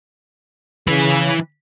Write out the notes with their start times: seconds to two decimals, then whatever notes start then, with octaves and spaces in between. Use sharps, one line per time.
0.88 C#3 E3 B4